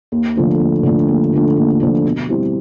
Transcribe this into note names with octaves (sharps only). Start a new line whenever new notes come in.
D#2
D3 F3 A3 D4
D#2
D3 F3 A3 D4
D#2
D3 F3 A3 D4
D#2
D3 F3 A3 D4
B2
G3 C4 E4